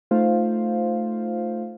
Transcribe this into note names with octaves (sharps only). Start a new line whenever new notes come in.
A3 D#4 F4 C5 F5